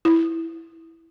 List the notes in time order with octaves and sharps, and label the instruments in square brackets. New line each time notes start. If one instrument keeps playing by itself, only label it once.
[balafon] E4